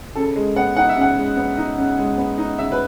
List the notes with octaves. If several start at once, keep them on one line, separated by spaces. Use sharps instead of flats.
C#3 A4
G#3
B3 F#5
D#4 F#5
E5
C#3 F#5
G#3
B3
D#4
C#3
G#3
B3
D#4
C#3 E5
B4